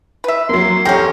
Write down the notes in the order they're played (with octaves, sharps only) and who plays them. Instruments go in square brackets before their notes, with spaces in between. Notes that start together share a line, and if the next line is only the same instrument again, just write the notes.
[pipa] B4 E5
[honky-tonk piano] F#3 A#3 [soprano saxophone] C6
[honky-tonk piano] E2 A4 A#6 [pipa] C#3 A#3 [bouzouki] C#4 G4